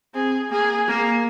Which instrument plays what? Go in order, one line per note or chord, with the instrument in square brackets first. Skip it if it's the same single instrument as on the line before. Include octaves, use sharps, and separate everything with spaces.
[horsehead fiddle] C4 [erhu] G#4
[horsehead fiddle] A#3 [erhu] G#4
[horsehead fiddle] A#3